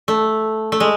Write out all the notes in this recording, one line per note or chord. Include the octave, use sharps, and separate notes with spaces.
A3
A3
G#3